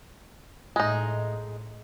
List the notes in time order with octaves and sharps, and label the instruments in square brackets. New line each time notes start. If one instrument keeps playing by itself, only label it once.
[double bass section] A2 [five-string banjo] G#3 D#4